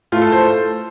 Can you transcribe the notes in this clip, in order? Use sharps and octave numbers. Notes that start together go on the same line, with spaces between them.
A2 A3 F4
A4
C5